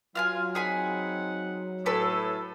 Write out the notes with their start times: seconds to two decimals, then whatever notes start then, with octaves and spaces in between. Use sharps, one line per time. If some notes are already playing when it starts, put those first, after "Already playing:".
0.15 F#3 F4 G#5 A5 F6
0.55 C4 D#4 G#4 F#5 G#5 B5
1.86 A2 A4 B4 G#5